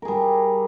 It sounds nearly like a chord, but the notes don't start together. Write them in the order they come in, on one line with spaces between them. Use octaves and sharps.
A#4 G#4 G3